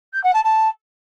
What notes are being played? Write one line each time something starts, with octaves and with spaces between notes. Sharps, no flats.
G6
F#5
A5
A5